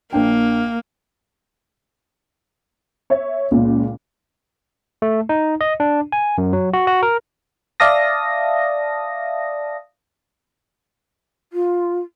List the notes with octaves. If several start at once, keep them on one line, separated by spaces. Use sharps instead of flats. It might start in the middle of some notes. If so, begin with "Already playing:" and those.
A#1 A#3 D4 G5
C#5 E5
C#2 A#2
A3
D#4
D#5
D4
G#5
F#2
F#3
F#4
F#4
A#4
D5 E5 F5 A5 D#6 A#6
F4